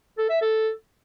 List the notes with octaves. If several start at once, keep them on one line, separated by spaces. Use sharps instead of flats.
A4
E5
A4